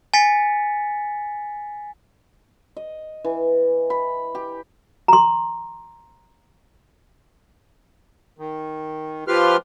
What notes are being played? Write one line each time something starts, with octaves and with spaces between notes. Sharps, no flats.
G#5 A6 B6 C#7
D#5
E3
B5
G4
A#5 C6
D#3
F3 F4 G4 B4 C6 F6